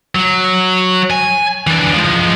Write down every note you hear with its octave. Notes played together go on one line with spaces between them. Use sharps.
F#3
G#5
E3 D4
F3 G#3